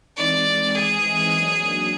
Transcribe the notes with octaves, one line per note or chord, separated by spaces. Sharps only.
E3 G#3 C4 D#4 D5
G#4
F#3 A#3 D4